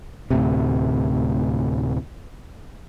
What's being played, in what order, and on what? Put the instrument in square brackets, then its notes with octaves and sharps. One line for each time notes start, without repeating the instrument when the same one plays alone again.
[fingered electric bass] D2 A2 C3